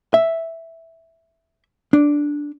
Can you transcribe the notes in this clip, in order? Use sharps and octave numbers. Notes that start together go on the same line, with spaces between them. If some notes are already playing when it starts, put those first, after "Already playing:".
E5
D4